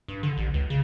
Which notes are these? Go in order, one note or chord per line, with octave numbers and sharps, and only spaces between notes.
G2
D3
A1
C#2
C#3